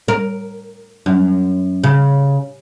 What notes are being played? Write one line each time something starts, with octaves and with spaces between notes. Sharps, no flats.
A#4
F#2
C#3